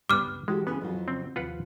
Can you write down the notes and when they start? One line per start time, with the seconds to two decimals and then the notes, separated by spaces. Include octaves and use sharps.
0.09 F#1 C#2 G2 G3 B3 D6 F6
0.48 E3 G#3 F#4 G4 A4
0.67 C#3 B3 C4 G#4
0.81 F2 F#3 F4
1.08 C#3 C4
1.36 D#2 C3 F3 F4 B4 F#5